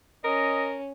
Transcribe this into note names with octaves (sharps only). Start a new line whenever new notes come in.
C#4 A#4 D#5